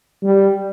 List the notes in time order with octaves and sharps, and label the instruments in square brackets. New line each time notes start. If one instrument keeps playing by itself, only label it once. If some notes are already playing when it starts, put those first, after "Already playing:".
[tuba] G3